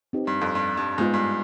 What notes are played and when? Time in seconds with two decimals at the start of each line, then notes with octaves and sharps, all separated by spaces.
0.13 C4 D#4 G4 B4
0.27 G2
0.41 F2
0.55 G2
0.77 G2
0.98 G#2 G#3 B3 F4
1.14 G2